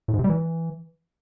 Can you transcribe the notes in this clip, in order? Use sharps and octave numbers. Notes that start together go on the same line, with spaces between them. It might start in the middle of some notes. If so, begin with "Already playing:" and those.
A2
G#2
C3
G3
E3